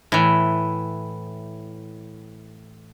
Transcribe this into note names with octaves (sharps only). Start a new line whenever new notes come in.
A2 E3